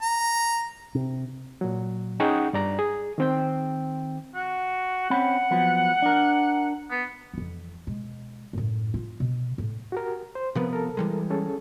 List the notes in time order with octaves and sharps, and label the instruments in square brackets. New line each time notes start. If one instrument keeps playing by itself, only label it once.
[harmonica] A#5
[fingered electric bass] C3
[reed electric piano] A#2 F#3
C#4 D#4 G#4 F#5 G5 C#6
G2 D5 A#5
G#4
D#3 C4 G5
[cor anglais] F#4
[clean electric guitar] C4 C#4 B5 [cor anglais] F#5
[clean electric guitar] F3 F#3 B3
D4 A#4
[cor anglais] B3
[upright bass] F2 E3
B2 G#3
F#2 A2
F4
B2
A2
[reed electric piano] F#4 G4 A#4
C5
[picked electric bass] C3 F3 B3 [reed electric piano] C4 A#4 B4
[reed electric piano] A4 A#4
[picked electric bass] E3 G3 G#3
[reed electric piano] C#4 G#4 A4